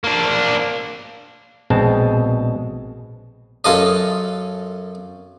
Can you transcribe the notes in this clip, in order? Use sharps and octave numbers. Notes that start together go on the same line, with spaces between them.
A#3 D4
A#1 B2 G#3 C4 A5
F#2 F4 A4 D#5